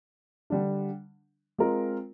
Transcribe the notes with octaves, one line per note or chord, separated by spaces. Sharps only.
D3 G3 D4
G#3 C4 F4 A#4